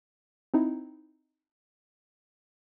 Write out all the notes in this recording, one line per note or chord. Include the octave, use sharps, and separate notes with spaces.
C4 D#4 E4